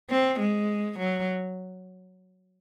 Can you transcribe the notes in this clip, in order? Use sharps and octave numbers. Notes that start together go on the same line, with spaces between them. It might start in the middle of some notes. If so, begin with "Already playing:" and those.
C4
G#3
F#3